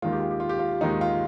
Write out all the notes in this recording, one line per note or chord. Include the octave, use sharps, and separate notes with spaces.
D#2 D#3 G#3 F4
G4
F4
G4
F4
G4
F4
D#2 D#3 G#3 D#4
F4